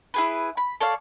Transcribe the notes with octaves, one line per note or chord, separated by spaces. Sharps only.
E4 G#4 B4
B5
A4 C#5 D5 F5